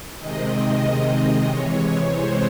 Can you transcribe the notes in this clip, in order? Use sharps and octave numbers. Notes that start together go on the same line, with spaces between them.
C3 D#3 G#3 C4 D#5
C3 E3 G#3 C#5
C5